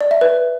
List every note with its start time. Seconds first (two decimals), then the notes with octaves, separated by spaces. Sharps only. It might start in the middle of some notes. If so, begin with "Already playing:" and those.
0.01 D5
0.11 E5
0.21 B4